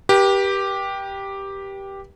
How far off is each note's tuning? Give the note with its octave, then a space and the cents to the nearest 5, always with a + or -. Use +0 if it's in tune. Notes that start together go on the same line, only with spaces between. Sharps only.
G4 +0 B4 -45